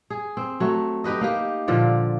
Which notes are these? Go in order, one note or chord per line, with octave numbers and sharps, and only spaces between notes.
G#4
C4
F#3 A3
D#4 G4 B4 D#5
A#3 D#4 G4
A#2 D3 F3 D5